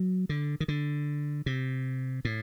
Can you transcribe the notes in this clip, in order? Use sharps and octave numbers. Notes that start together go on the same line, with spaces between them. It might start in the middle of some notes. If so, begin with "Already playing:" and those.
Already playing: F#3
D3
D#3
D3
C3
A2